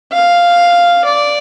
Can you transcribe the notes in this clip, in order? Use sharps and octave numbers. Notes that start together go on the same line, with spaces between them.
F5
D5